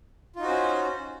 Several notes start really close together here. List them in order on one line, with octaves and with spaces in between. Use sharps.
F4 D#4 F#4 C5 C#4